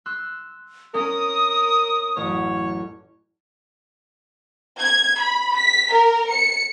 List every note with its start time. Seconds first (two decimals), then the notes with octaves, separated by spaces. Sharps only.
0.06 C6 E6 F#6
0.94 C#4 A#4 D#6
2.17 A1 F#2 C#5
4.80 G#6
5.20 B5
5.55 B6
5.92 A#4
6.33 C#7